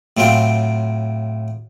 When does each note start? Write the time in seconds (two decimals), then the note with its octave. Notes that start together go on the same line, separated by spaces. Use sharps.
0.17 A2 F#3 C4 F4 G5